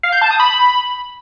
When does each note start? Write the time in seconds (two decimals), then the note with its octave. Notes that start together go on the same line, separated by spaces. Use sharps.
0.03 F5
0.12 G6
0.21 A5
0.31 D#6
0.40 B5